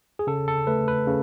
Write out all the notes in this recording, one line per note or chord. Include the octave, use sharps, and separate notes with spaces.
G#4
C#3 A4
A4
A3 B4
B4
C#3